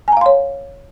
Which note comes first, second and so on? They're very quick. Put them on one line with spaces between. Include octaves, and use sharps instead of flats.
G#5 A#5 F5 C6 C#5